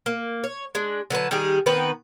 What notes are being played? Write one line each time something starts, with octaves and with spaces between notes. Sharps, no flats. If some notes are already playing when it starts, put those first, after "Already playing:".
A#3
C#5
G#3 D4
D3 F#3 B4 A5
D#3 G3 G4 G#4
D#3 B3 C4 B4